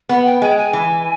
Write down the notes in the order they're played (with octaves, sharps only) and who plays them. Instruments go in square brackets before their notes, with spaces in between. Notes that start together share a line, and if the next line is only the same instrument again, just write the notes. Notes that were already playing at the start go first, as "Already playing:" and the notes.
[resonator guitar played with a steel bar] B3 [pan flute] F#5
[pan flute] G5
[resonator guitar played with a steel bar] G#3 [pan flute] G#5
[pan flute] G5
G#5
[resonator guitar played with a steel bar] E3